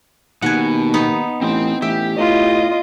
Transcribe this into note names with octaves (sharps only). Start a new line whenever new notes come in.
D#2 B2 F#5 G#5
B3 D#4
A1 C4 C6
A1 G4 E5
A2 F4 D#5